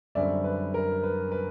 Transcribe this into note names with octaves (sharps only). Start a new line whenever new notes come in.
F#2 D3 G3 C4 D5 E5
B4
A#4
B4
B4